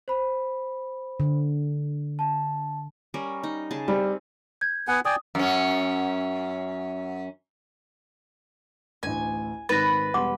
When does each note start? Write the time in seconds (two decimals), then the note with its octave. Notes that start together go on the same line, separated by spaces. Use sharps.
0.08 C5 B5
1.20 D3
2.19 A5
3.14 G3 C#4 A#4
3.43 D#4
3.71 C#3 G#4 A5
3.88 G3 C4
4.61 G6 G#6
4.88 B3 F#5 G#5
5.05 D5 G5 G#5 D#6
5.35 F#2 C#4
9.03 A1 D2 G#5
9.69 G#1 D#3 B4 A6 A#6
10.14 E1 G3 F#5 C6 D6